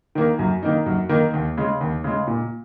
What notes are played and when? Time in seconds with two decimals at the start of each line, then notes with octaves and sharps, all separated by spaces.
0.15 D#3 A#3
0.39 F#2
0.63 D#3 A#3 D#4
0.86 F#2
1.09 D#3 A#3 D#4
1.33 D#2
1.57 C#3 G#3
1.81 D#2
2.04 C#3 G#3
2.27 A#2